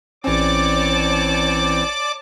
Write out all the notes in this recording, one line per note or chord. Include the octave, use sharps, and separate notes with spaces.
A1 E3 C4 C#4 C#5 D5 A5 D6